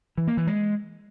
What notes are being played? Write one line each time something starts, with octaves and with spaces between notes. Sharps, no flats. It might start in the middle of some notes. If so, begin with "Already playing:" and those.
E3
A#3
E3
G#3